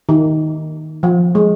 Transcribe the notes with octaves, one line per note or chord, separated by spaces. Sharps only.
D#3
F3
G#3